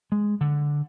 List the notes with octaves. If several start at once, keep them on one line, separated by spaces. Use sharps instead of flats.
G#3
D3